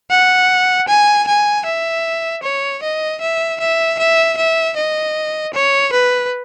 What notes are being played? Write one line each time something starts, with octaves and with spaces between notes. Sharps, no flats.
F#5
G#5
G#5
E5
C#5
D#5
E5
E5
E5
E5
D#5
C#5
B4